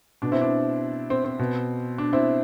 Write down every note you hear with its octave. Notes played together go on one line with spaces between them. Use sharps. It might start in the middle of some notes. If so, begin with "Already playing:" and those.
B2 D4
C4 E4
D4
C4
C4
B2
D4
C4 E4